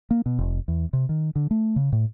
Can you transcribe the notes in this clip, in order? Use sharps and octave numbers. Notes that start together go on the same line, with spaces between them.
A#3
B2
F1
E2
C3
D#3
D3
A3
C#3
A2